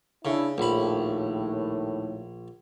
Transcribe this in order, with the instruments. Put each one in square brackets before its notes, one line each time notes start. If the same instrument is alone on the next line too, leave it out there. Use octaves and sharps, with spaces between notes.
[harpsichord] C#3 [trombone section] D4 E4
[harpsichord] A#1 B5 [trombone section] D#2 A2